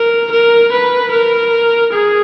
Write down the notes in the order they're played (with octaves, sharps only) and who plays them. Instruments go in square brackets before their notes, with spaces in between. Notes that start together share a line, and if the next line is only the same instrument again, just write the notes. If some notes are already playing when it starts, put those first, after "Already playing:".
Already playing: [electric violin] A#4
A#4
B4
A#4
G#4